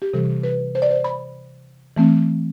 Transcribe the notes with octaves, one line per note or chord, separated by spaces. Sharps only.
G4
C3 E3 G3 A4
B4
C5
D5
C5
B5
E3 A3 C4